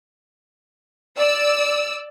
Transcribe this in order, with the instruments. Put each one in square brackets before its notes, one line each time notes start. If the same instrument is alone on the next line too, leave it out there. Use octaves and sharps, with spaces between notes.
[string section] D5 E6